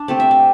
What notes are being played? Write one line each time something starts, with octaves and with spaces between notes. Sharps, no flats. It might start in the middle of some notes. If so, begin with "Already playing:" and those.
Already playing: D4
C3 A3 C4 D5
E5
D5